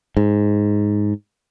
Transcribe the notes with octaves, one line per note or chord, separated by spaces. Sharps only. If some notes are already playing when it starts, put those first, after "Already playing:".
G#2